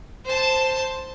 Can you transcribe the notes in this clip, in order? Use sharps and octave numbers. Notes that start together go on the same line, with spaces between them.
C5 A5